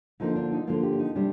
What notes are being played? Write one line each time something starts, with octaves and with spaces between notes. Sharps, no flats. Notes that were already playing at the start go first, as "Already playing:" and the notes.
D3 F3 A#3 D#4
D4
D#4
D3 F3 A#3 F4
G4
D4
D#4
C3 G3 D4